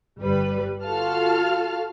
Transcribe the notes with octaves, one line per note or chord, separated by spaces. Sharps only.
G1 G3 B4
F4 F#4 A4 F5 A5 F6